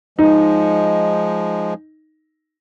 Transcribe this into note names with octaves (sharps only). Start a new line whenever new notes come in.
F3 G#3 D#4